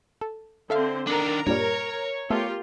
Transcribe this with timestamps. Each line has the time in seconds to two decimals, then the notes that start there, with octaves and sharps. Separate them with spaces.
0.21 A4
0.70 D3 C4 A4 C5 E5 F5
1.07 D#3 D4 A#4 A#5
1.47 G2 A#2 G3 C#5
2.30 A3 B3 F4 G4 A4 A#4